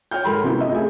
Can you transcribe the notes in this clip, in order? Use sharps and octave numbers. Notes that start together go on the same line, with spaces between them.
C#5 G5 F6 G6
G#2 A4 A#4 B5 C6
C3 B3 C#4 E4
F4 D#5 E5
A3 G#4